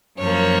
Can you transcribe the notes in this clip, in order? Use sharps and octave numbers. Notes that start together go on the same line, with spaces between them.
F#2 F3 A#3 C#5